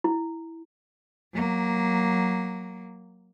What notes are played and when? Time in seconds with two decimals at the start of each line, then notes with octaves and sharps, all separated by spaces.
0.04 E4
1.34 F#3 A#3